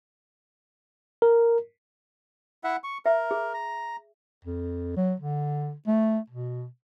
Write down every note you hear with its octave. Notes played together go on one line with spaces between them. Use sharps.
A#4
E4 E5 F#5
C#6
A#4 E5
G#4
A#5
F2
F#3
D3
A3
B2